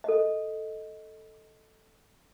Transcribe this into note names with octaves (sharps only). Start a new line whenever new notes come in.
A4 D#5